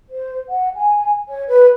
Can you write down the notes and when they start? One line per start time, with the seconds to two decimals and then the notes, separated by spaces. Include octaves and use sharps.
0.08 C5
0.49 F#5
0.75 G#5
1.28 C#5
1.49 B4